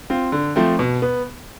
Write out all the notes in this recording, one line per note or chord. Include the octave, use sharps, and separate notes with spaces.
C4 F4
D3
F3 A3 C4
B2
B3